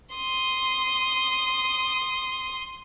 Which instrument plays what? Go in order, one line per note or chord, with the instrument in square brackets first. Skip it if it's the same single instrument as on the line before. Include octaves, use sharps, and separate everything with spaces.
[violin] C6 D#6